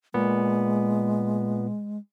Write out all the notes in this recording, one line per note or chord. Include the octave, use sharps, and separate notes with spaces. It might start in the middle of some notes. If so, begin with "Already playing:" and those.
A#2 G#3 B3